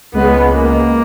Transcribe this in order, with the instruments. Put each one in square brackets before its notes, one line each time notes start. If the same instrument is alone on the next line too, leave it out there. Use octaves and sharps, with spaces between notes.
[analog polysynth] C#2 C#3 G#3 [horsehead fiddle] B3
[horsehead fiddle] A#3